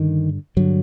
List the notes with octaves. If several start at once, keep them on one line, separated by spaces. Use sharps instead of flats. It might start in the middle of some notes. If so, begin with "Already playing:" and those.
Already playing: G2 D3 D#3
G2 D3 F#3